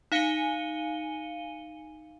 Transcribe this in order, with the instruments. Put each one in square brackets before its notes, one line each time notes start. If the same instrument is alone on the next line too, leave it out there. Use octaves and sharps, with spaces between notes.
[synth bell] D#4 F5 G#5 C#7 D#7 G7